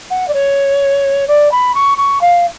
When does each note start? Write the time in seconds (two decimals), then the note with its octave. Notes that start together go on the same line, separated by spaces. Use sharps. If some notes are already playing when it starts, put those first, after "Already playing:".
0.10 F#5
0.28 D5
0.33 C#5
1.27 D5
1.51 B5
1.74 C#6
1.97 C#6
2.21 F5